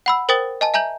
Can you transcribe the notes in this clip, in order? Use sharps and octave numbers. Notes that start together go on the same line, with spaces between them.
F#5 B5 E6
A#4 C5 G5 D#6 A6 F#7
D#5 G#5 A5
E5 G#5 A#5 G6 F#7